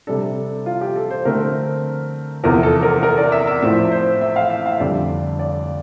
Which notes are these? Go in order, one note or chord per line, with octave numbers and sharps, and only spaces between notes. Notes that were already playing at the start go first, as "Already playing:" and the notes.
C3 G3 D4 A4
F4
G4
A4
C5
D3 A3 C4 A#4
E2 C3 F3 A#4
A4
A#4
A#4
D5
E5
E5
A2 F3 C4 E5
C5
E5
F5
E5
F5
F2 D3 G3 D5
D5